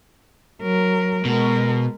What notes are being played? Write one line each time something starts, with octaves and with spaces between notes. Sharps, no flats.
F#3 A#4
B2 G#3 A#4